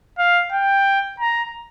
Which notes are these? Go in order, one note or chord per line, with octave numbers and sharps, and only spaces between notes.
F5
G5
A#5